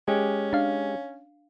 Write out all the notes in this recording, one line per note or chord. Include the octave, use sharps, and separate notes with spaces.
G#3 C#4 G4
D4 F5